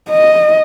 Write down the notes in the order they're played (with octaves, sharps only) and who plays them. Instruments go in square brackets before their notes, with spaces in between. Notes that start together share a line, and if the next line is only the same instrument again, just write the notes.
[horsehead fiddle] D#5